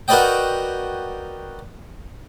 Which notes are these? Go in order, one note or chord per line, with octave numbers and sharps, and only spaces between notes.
F#4 A#4 B4 D5 D#5 G5